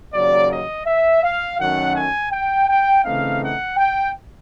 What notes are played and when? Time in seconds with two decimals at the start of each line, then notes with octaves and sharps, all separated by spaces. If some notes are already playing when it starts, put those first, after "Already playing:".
0.14 D#2 C#3 F#3 A#3 D5
0.51 D#5
0.86 E5
1.24 F5
1.59 F#2 D#3 F#3 A3 C#4 F#5
1.95 G#5
2.32 G5
2.68 G5
3.04 C#3 E3 A3 C4 D#4 F5
3.42 F#5
3.77 G5